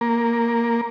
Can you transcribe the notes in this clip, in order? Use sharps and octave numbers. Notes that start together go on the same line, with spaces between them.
A#3